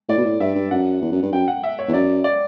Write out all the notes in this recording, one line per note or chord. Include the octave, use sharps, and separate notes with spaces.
A2 D5
B2
A2
G2 E5
G2
F#2 F#5
E2
F#2
G2
F#2 G5
F#5
E5
C#5
E2
F#2 D5
D5